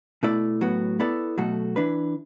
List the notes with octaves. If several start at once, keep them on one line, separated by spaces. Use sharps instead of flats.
B2 A3 E4 D5
A2 F#3 B3 F#4
B3 E4 A4 D5
B2 F#3 A3 F#4 A4
E3 D4 B4